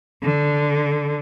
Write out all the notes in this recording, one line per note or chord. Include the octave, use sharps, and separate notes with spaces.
D3